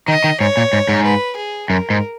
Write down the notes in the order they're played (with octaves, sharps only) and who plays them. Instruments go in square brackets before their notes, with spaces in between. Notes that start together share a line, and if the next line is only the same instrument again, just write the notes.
[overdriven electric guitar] D#3 [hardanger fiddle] D#5
[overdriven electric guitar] D#3
[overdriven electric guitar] G#2 [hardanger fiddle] C#5
[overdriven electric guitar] A#2
G#2
G#2
[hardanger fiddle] B4
G#4
[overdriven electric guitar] F#2 [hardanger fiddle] A#4
[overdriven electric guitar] G#2